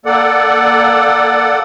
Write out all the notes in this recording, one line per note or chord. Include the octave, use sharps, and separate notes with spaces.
A#3 A4 D5 F#5